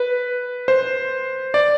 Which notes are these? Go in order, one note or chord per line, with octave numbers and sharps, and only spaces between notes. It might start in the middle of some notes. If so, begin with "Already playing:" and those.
Already playing: B4
C5
D5